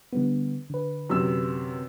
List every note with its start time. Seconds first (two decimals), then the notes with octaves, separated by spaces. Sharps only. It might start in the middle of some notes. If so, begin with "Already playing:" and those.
0.12 D3 G3 B3
0.70 D3 B4
1.10 F#2 C3 E6